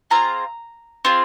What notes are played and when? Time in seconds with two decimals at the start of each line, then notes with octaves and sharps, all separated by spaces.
0.10 C4 F4 G#4 A#5
1.05 C4 F4 G#4